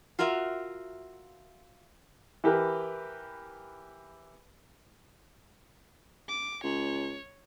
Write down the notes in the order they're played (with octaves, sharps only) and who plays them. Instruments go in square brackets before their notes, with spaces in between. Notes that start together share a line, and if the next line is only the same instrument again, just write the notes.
[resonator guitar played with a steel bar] F4 F#4 A#4 E5 F5
[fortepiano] E3 G4 A#4 B4
[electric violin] D6
[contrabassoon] C#2 [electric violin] C#5